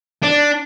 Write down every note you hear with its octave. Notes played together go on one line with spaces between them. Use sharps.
D4